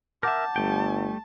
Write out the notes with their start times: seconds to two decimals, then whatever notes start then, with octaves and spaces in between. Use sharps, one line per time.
0.23 A#4 E5 F#5 A5 D6 G6
0.56 G1 G3 A3 G5